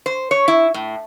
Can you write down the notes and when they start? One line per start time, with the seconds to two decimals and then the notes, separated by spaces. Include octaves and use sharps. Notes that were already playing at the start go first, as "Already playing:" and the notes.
0.06 C5
0.31 C#5
0.48 E4
0.74 A2